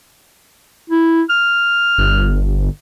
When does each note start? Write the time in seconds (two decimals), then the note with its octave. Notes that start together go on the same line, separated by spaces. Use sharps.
0.90 E4
1.30 F6
1.98 G1